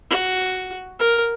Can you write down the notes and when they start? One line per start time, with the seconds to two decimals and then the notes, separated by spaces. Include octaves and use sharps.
0.10 F#4
0.99 A#4